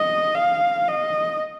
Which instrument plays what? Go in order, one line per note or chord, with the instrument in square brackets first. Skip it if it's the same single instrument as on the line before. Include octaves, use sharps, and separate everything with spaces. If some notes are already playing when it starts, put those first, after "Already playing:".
Already playing: [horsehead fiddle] D#5
F5
D#5